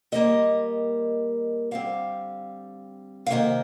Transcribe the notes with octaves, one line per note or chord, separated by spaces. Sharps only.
D#3 G3 A#3 D#5
D3 G3 C4 F5
F5
C3 D#3 A#3 D#5